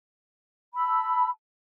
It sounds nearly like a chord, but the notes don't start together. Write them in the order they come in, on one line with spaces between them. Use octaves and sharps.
B5 E6 A5